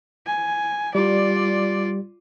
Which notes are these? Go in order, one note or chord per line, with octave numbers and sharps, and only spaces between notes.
G#5
G3 F4 D5